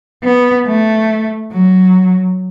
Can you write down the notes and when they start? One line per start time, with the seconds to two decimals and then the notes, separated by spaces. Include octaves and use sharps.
0.23 B3
0.67 A3
1.52 F#3